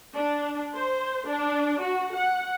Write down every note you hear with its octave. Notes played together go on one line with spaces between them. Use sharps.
D4
C5
D4
F#4
F#5